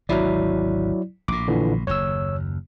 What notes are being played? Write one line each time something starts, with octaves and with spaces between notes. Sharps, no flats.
G#1 D2 C3 F#3 E4 D5
A#1 A2 D6
A#2 D3 E3
F#1 D#2 C#5 E6